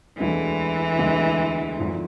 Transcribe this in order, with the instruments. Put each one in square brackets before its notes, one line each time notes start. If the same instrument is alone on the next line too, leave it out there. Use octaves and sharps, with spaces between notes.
[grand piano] E1 D2 D3 G#3 [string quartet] E3
[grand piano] E1 D2 D3 G#3
G#1 G#2 F3